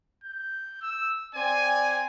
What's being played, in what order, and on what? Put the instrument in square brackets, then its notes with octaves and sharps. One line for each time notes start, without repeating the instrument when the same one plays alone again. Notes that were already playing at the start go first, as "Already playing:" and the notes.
[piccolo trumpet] G6
E6
[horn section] C4 G#5 [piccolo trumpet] D5